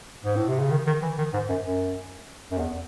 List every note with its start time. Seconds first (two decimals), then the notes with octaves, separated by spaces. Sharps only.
0.25 G#2
0.36 A2
0.48 C3
0.59 C#3
0.71 D#3
0.87 D#3
1.02 E3
1.18 D#3
1.33 G#2
1.49 F#2
1.64 F#2
2.51 F#2
2.59 E2